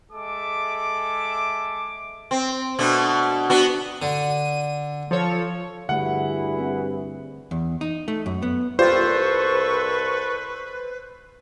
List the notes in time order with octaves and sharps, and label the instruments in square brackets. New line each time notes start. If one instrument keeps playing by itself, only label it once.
[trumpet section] G#3 A4 E5 D6
[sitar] C4
B2 A3 D4
B3 D4 F#4
[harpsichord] D3 [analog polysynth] D#7
[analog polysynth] F3 A4 C#5
[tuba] G2 [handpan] D3 A3 [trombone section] E4 F#4 G#4 [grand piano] F#5
[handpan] C4
[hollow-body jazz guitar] E2
D#4
A3
F#2
B3
[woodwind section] C2 A4 C#6 [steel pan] F4 G4 D5 [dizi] B4 [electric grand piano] C5